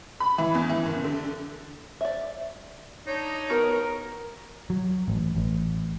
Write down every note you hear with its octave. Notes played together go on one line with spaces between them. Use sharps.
B5
E3
E2
E3
F#1
D3
D5 E5
D4 D#4 C#5
B3 F#4 A#4
F#3
A1
A1